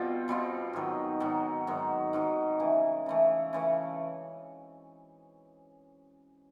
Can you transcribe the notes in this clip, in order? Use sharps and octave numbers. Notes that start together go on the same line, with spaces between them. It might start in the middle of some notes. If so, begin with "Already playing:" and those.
Already playing: B2 G3 C4 F4
B2 G3 C4 F4
G#2 D#3 F#3
G#2 D#3 F#3
G#2 D#3 F#3
G#2 D#3 F#3
C#3 E3 A3
C#3 E3 A3
C#3 E3 A3